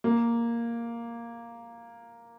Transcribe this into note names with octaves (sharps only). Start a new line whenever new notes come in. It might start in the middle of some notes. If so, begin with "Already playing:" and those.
A#3